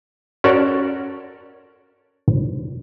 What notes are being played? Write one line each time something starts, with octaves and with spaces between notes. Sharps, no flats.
C#4 F#4 A4 A#4 D5